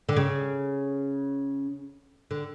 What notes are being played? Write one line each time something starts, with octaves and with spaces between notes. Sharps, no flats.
D3
C#3
D3